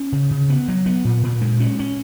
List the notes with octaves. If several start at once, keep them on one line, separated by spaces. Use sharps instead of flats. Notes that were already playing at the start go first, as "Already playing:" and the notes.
Already playing: C#4
C#3
C#3
B3
F#3
B3
A#2
A#2
G#3
C#4
C#4